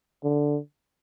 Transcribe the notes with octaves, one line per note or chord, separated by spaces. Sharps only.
D3